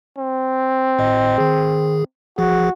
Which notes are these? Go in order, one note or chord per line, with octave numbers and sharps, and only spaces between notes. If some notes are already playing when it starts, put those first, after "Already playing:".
C4
G#1 A2 D#5
D#3 G#4
A1 F3 F#4 G#4